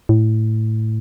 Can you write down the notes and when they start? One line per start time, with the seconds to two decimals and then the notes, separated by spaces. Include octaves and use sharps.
0.09 A2